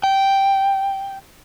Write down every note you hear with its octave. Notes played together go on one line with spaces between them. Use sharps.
G5